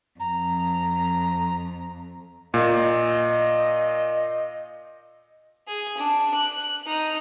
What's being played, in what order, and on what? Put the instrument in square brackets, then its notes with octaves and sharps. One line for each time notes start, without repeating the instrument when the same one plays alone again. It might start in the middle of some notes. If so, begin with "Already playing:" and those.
[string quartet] F2 [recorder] A#5
[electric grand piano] A#2 [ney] D#5
[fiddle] G#4
D4
F#6
D#4